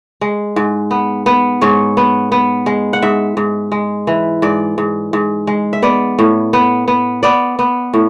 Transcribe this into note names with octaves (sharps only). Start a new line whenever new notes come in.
G#3
G#2
B3
B3
G#2 C#5
B3
B3
G#3
F#5
G#2 E5
G#2
G#3
E3
G#2 D5
G#2
G#2
G#3
E5
B3 D5
A2
B3
B3
B3 D5
B3
A2